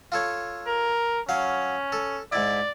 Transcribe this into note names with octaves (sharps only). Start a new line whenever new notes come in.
F4 A4 C#5
A#4
F#3 C#4 F5
A4
G#2 E4 D5